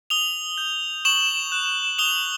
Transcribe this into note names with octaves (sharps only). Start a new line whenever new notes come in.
D#6 F7 G7
G6
C#6 E7 F#7
F#6
D#6 F7 G7